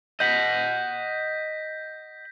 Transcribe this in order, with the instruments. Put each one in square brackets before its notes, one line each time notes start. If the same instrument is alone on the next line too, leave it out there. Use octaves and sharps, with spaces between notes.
[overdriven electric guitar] D#5 F#5 [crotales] G6 A#6 B6